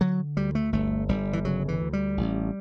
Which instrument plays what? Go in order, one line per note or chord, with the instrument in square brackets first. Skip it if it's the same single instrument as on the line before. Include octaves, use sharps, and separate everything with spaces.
[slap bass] D3 F#3
D2 G3
A3
G1 A3
G1 G3
E3
C#3 F#3
E3
D2
G3
A1